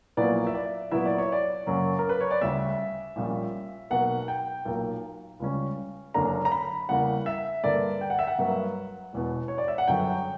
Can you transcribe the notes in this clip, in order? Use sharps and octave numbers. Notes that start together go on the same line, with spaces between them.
A#1 A#2 F#3 B3 E4 D5
E5
D5
A#2 F#3 B3 E4 E5
D5
C#5
D5
F#2 C#3 F#3 A#3 C#4
A#4
B4
C#5
D5
D2 C#3 G3 E5
A#1 A#2 G3 C#4
B1 B2 A#3 F#5
G5
B1 A#2 A#3
C#2 C#3 G3 C#4
F#1 F#2 D3 A#3 D4 A#5
A#5
B5
E2 C#3 G3 A#3 F#5
E5
G2 D3 A#3 D5
G5
F#5
E5
F#5
G2 F#3 A#3
E1 E2 B2
C#5
D5
E5
F#5
G1 F#2 D3 F#3 G5